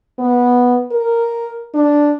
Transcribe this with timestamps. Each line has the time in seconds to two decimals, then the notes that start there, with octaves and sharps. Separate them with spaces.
0.19 B3
0.92 A#4
1.74 D4